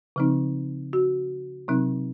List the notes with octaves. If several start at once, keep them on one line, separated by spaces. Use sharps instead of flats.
C#3 F3 C4 D#4
F#4
C3 F#3 C4 D#4